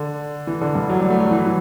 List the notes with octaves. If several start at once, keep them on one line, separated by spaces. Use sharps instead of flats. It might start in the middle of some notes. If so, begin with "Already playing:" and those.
Already playing: D3
E3
D3
G2
F#3
G3
A3
F#3
E3
F#3
E3